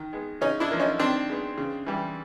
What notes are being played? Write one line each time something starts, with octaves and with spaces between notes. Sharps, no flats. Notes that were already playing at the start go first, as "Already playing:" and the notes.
Already playing: D#3
G#3 B3
C#3 C#4 D#4
D4 E4
F3 A#3
C#4 D#4
D#3 C4 D4
G#3 B3
C#3
E3 G3